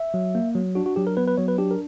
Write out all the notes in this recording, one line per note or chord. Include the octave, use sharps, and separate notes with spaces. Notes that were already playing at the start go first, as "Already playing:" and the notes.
Already playing: E5
F#3
A#3
F#3
D4 F#4
F#4
F#3 G4
A#4
B3 B4
B4
F#3 C#5
B4
D4 G4
A#4